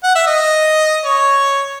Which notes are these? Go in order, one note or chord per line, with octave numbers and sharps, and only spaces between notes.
F#5
E5
D#5
C#5